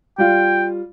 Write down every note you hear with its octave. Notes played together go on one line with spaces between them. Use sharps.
G3 F4 G5